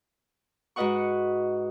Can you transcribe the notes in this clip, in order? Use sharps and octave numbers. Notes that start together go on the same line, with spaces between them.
G#2 F#4 B4 D#5 F#5 C#6